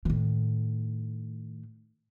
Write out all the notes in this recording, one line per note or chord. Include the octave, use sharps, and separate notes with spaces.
A2 D#3